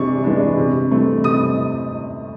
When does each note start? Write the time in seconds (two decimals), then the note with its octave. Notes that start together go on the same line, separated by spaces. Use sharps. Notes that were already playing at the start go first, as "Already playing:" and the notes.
Already playing: C3 E3 G#3 D4 C#6
0.24 E3 G#3 B3 D4
0.57 C3
0.91 E3 A3 C4
1.24 C3 D#6